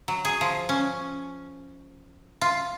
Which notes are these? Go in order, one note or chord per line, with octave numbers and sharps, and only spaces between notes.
F#3
G#4
F3
C#4
F4